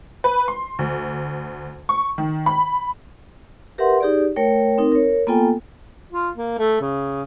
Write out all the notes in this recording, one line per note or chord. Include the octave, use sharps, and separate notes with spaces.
B4
C6
D2
C#6
D#3
B5
G4 A#4 B4 E5 F#5 C6
D#4 G4 G#4 D5
A3 A#4 C#5 G5
C4 D#4 A#4
A#4 C#5
A#3 B3 F4 A4 G5 G#5
F4
A#3
A3
C#3